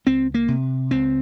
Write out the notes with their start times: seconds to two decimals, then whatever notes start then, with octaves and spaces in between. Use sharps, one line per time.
0.06 C#2 C4
0.34 A#3
0.48 C3
0.91 C#2 C4